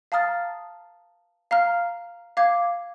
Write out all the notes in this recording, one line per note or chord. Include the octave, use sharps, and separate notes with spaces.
F5 A5 A#5 D#6 F6 A6
F5 A#5 F6
F5 D6 G#6